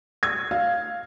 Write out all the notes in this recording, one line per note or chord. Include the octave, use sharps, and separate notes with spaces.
G#6
F5